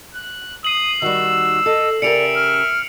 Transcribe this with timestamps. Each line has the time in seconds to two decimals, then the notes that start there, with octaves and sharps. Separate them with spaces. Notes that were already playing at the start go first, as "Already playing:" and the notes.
0.15 F#6
0.65 D#6 C7 F#7
1.02 D#3 G3 F#4 E6
1.66 A4 D#5
2.02 C#3 G4 A#4 D5 E5 C#7 D7 F7
2.35 F6